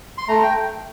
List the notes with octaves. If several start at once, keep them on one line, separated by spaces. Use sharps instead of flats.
C6
A3 A#5
G5